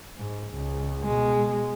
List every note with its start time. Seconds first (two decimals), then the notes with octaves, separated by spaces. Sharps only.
0.17 G#2
0.54 C#2
1.03 B2 G#3